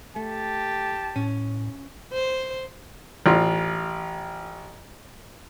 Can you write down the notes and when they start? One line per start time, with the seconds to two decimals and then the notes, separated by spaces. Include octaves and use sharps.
0.16 A3 G4 A5
1.16 A2 C#4
2.13 C5
3.26 A1 F4